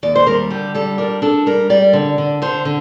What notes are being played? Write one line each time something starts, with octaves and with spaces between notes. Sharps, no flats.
D#2 D5
C5
G3 A#4
D3 G4
G3 A4
D4 A#4
D4 A4
G3 A#4
G3 D5
D3
D3
D3 C5
D3